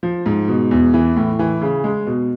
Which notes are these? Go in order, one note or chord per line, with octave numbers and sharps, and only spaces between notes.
F3
G#2
B2
E2
E3
A2
E3
C#3
G#3
B2